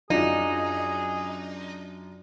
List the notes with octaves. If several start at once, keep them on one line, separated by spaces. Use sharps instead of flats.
F#2 F#3 D4 D#4 F4 G#4 F5